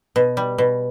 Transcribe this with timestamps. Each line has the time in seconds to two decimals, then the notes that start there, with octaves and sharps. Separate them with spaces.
0.16 B2
0.37 G3
0.58 B2